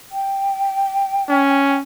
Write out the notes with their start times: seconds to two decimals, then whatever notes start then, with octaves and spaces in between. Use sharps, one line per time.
0.12 G5
1.29 C#4